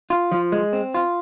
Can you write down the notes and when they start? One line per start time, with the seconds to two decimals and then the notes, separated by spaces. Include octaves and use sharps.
0.10 F4
0.32 F3
0.52 G#3
0.73 C4
0.94 F4